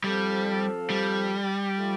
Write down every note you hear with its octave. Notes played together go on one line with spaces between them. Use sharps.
F3 G3 C4 A4 F5
G3
F3 A3 F4